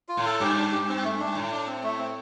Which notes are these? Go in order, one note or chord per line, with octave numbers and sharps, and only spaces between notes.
F4
A2
A4
G2 G4
D4
G4
C4
A3
D4
A2
D4
C4
A3
C4